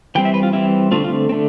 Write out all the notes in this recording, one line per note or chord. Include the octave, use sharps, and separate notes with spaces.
E3 G3 C4 G5
E5
B4
F4
E3 G3 C4 E4
D3 A3 C4 F4
F4
C4
D3 A3